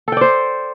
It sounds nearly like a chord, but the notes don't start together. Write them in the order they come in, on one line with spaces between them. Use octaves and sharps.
A4 G5 D5 C5